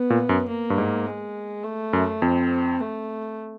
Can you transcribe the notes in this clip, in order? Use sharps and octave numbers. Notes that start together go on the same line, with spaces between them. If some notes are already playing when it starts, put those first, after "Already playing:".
Already playing: B3
A#2
F#2
A#3
G2
G#2
G#3
A3
F#2
F2 C4
A3